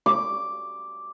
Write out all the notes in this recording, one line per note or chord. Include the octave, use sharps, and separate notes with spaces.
D6